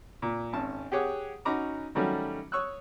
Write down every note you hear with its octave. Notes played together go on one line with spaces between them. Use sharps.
A#2
G#1 C#4 A5
G4 G#4 C#5 F#5 D6
C#4 D#4 F#4 A#5 B5 D6
D#3 F#3 G3 A3 C#4
C#5 C#6 D#6 E6 F#6